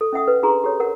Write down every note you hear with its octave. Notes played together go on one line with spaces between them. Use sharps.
A4
C#4 E5 F#5 D#6
B4
D4 F#4 G#4 A#5 C6
G4 A4 C#5
A#4 F#5